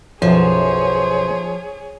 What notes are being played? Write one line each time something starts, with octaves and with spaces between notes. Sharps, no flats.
B1 F#2 F3 G#4 C5 C#5